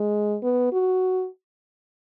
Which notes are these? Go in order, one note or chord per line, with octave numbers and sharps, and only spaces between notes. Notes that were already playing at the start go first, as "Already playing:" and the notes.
Already playing: G#3
B3
F#4